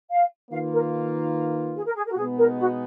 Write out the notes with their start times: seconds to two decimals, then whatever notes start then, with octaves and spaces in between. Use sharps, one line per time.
0.10 F5
0.51 D#3 A#3 F4 B4 F5
0.72 A#4
1.75 G#4
1.86 A#4
1.96 G#4
2.06 A#4
2.12 F#4
2.17 B2 G#3 B3 D#4 G#4
2.37 A#4
2.58 F#4